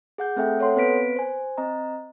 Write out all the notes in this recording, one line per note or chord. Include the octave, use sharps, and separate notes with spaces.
G#4 F#5 G6
A3 C4 A4 E5 G5
A4 C#5 F#5 C6
B3 C4 B4 B6 D7
C5 G#5
C4 D#5 A#5